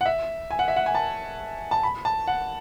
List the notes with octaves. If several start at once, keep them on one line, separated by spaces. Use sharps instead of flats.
F#5
E5
G#5
F#5
E5
F#5
G#5
A5
A5
B5
A5
F#5